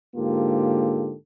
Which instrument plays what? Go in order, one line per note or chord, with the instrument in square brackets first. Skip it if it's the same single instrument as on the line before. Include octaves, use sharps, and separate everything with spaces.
[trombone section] G#2 D3 A#3 F4 G4 A4